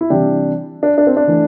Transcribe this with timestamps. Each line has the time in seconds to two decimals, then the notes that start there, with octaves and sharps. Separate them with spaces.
0.01 E4
0.10 C3 E3 G3 D4 G4
0.83 D4
0.98 D4
1.07 C4
1.17 D4
1.28 E3 A3